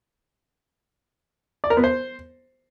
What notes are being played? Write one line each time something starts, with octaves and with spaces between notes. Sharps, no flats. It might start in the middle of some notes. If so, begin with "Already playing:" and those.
D5
A#4
B3
C5